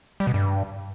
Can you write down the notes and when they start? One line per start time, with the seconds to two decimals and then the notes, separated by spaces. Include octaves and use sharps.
0.20 G3
0.27 B2
0.34 G2